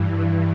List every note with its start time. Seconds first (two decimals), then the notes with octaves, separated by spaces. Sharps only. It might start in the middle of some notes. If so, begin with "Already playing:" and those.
Already playing: G2 E3